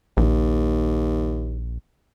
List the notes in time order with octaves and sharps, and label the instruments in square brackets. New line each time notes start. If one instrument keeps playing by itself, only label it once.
[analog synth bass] A#1 [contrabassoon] D#2